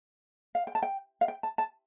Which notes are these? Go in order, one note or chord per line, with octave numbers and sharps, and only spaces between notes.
F5
G5
A5
G5
F5
G5
A5
A5